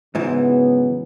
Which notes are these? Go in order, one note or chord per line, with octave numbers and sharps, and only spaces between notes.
G#2 C#3 E3 F#3 B3